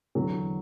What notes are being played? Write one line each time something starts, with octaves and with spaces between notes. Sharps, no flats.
E2 D3 F#3